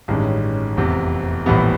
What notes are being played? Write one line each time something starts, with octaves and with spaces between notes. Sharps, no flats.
A1 G2 D#3 G#3 C#4
F1 E2 C3
A#1 A2 E3 G3 B3